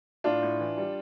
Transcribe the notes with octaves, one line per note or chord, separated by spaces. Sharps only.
A2 D4 F4
A2
E3
G3